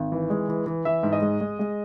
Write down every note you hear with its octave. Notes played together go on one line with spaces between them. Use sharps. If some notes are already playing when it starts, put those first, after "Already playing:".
Already playing: G#1
E3
G#3
E3
E3
E3 E5
G#2
D#5
G#3
G#3
G#3